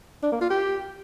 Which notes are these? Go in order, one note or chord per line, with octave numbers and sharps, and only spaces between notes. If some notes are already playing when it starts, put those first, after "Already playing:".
D4
A#3
F4
G4